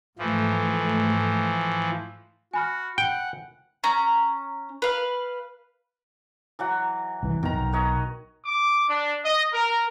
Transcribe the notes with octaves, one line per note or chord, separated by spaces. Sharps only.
G#2 E3 F3 A3
F#4 G#5 B5 F6
F#5 G5
C#4 A#5
B4 F5
E3 F#3 F#5
C2 E3
F2 B2 D#3 A#5
B1
B4 C#5 D#5
D6
D4
D#5
A#4